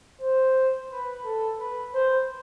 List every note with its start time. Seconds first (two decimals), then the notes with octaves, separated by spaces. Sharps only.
0.21 C5
0.91 B4
1.25 A4
1.59 B4
1.94 C5